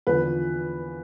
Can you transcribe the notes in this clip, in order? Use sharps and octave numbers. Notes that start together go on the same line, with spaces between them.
E2 D3 F3 B4